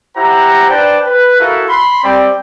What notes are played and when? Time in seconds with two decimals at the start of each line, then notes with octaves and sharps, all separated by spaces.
0.17 E4 G4 C5 F#5 A#5
0.70 D4 B4 C5 D5 G5 A5
1.07 B4
1.40 E4 F#4 A4 A#4 F5
1.69 B5 C6
2.04 G3 C4 D5 G5